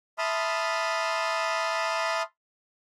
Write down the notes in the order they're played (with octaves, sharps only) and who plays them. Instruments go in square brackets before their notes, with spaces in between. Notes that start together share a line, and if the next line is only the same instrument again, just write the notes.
[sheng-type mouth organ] E5 A5 B5 C6 D#6 F6